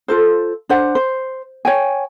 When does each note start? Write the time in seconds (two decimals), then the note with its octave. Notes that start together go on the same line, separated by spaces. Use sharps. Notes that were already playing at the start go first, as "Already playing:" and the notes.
0.08 F4 A4 C5
0.69 D4 C5 F#5
0.95 C5
1.65 C#5 G5 G#5